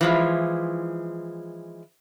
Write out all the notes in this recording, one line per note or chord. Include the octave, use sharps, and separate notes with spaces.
E3 F3 G#3